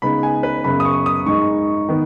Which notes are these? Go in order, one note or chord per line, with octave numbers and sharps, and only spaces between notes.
C#3 G#3 B3 D#4 B5
G#5
B4
F#2 C#3 B3 B5
D#6
C#6
D#6
G#2 G#3 D#4 C#6
D#3 B3